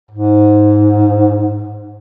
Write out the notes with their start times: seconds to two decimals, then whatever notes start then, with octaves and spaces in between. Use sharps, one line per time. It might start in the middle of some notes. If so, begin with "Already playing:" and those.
0.11 G#2